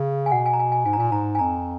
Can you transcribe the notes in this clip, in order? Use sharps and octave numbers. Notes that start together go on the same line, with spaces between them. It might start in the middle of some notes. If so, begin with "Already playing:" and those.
Already playing: C#3
G#5
B2 F#5
G#5
A#5
G#5
G#5
G#2 G#5
A#5
A#2 G#5
G#2 A#5
G#5
F2 A#5